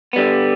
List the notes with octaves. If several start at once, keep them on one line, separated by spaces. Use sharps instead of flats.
D3 G3 B3